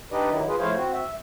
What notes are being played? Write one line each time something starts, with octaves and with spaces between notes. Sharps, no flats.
D4 D#4 G4 B4 D5 D#5
D#3 F#3 E4
F4 G#4 B4
F3 A3 E4 C5 C#5 F5
C4 F#4
E5